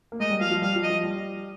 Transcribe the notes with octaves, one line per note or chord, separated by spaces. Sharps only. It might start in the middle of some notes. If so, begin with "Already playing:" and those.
A#3
G#3 D#5
G3
F3 F5
F3
G3 F5
F3
D#5
F3
G3